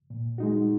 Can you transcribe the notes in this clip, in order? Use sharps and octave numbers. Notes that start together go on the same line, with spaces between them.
A#2
G#3 D#4 F#4